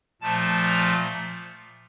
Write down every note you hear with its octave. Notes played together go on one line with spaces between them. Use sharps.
A#2 F3 A3 A5
A#5